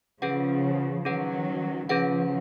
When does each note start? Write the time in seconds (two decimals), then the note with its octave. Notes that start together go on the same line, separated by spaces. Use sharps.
0.22 C#3 F3 C#4 G#4 B4 F#5
1.05 D#3 F#3 C#4 G#4 B4 F#5
1.89 C#3 F3 C#4 G#4 B4 F#5